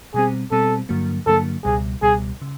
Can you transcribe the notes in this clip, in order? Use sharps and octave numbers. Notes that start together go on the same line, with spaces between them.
B2 G3 C4 G#4
B2 G3 C4 A4
G2 D3 F#3 A#3
G2 D3 F#3 A#3 A4
C#2 B2 G3 G#4
C#2 B2 G3 G#4
C#3